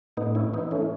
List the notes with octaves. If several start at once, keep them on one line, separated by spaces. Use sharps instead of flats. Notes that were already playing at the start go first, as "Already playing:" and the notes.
A2 B3 D#4
C#4 E4
E3 B3 D#4
A3 C#4